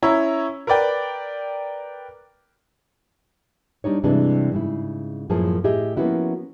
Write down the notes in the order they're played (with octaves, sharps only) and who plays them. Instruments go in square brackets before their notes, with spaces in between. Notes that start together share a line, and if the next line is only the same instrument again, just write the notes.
[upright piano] C#4 E4 C#5 A#5
A#4 B4 D5 G5
[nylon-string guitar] G3 D4 D#4 C#5
G2 C3 E3 G#3 D4 A5
G#2 C#3 E4
F#2 A2 F3 A#3 G#4 A5
A2 G4 G#4 D#5 E5
F3 A#3 B3 C#4 E4 F#4